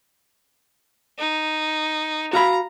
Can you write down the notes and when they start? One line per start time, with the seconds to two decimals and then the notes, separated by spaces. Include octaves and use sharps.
1.18 D#4
2.33 F#4 F5 A#5 B5